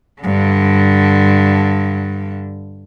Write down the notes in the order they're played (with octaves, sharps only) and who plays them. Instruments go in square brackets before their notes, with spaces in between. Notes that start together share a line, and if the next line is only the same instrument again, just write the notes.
[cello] G2 D3